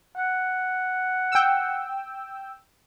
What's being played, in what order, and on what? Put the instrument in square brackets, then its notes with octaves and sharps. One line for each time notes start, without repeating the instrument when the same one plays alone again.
[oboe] F#5
[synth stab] G5 E6